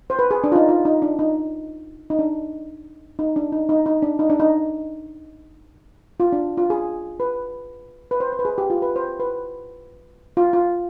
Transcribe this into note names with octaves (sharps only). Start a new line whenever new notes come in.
C5
B4
G#4
D4
F4
D#4
F4
D#4
D4
D#4
D#4
D4
D#4
D4
D#4
D#4
D#4
D4
D#4
D4
D#4
F4
D4
F4
G#4
B4
B4
C5
C5
B4
G#4
G4
F4
B4
C5
B4
F4
F4